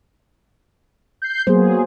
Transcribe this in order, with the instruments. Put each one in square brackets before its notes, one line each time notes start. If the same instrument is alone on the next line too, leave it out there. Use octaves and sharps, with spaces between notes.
[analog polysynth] G6 C7
[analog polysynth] F#3 G#4 [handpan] A#3 B3 C5